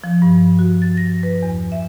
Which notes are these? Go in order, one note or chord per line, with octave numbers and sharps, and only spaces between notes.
F3
G2
F#4
A6
A#6
B4
E2
E5